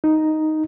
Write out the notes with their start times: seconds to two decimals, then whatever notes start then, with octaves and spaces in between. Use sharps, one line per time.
0.04 D#4